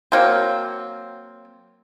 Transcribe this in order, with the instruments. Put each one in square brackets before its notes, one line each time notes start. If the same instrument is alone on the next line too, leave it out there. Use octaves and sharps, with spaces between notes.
[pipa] F#3 A#3 C4